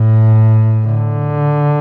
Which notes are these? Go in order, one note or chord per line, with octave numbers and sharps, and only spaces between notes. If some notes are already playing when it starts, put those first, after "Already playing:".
Already playing: A2
D3